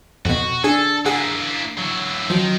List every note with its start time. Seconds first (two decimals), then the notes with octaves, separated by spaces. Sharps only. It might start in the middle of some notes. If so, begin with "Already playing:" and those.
0.25 F2 B2 F#4
0.64 D4 G#4 A4 G#5
1.06 A#3 E4 G#4 F#5
1.78 F#3 E4
2.30 D#3 F3 F#3